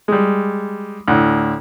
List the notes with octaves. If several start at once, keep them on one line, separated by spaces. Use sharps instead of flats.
G3 G#3
D2 A2